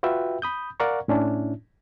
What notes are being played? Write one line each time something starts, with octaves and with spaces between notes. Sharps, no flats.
F4 F#4 B4 E5 G5
B5 D#6 G6
A#4 D5 F5 F#5 A#5 C#6
A2 C#4 D4 E4